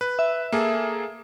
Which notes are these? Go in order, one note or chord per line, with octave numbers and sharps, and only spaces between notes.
B4
E5
A#3 G#4 A4